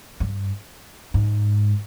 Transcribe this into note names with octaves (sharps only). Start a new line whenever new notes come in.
G2
G#2